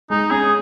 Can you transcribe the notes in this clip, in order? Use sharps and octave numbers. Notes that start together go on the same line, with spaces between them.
G#3 D#4
C#4 G#4